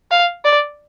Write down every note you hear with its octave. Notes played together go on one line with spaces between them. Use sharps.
F5
D5